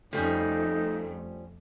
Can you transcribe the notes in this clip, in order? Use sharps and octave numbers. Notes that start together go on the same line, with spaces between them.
F2 F3 G3 A3 C#4 D#4 A4